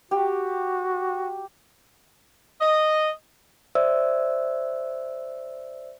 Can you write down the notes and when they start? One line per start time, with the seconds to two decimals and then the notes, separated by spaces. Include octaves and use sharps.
0.11 F#4 G4
2.61 D#5
3.75 C5 D5 E5 E6